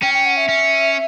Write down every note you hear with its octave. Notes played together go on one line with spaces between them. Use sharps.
C#4 G5
G5
F#5
E5
C#4